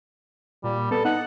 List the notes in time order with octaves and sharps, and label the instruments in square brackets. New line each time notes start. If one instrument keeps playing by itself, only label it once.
[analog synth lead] A#2 [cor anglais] G3
[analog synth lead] B3 [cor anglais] A4
[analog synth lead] D#4 [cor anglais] F#5